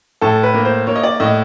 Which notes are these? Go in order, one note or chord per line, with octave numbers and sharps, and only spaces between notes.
A2 A4
B4
A#3
C5
A#3 C#5
D#5
D5
A2 D#5